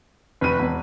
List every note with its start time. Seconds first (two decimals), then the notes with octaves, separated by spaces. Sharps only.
0.41 F1 B4 D#7
0.59 E1